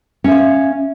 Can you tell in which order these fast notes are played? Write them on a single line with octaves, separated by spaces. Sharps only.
C#4 E5 F5